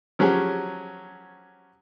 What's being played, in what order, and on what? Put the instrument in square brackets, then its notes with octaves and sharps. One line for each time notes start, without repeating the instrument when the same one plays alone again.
[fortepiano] F3 F#3 C#4 G4 G#4